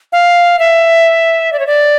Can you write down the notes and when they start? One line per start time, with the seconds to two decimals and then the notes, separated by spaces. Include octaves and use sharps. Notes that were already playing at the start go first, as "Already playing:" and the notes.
0.12 F5
0.59 E5
1.53 D5
1.59 C#5
1.67 D5